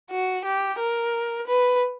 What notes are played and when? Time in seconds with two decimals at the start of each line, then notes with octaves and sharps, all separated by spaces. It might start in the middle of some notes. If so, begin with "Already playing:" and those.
0.11 F#4
0.45 G4
0.79 A#4
1.47 B4